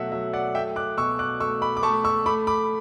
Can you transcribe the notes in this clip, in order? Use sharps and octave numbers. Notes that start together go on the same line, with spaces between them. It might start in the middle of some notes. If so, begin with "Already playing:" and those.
Already playing: B2 F#3 A3 E5 F#5
F#3 E5
D5 F#5
A3 E5 G5
D6 F#6
B2 C#6 E6
D6 F#6
A3 C#6 E6
B5 D6
D6
A3 A5 C#6
C#6 E6
A3 B5 D6
B5 D6